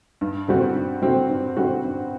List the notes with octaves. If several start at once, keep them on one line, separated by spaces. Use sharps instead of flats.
G2
D3 G3 C4 F#4
G2
D3 G3 C4 F#4
G2
D3 G3 C4 F#4
G2